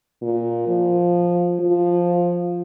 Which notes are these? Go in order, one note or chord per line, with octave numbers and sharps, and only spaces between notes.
A#2
F3
F3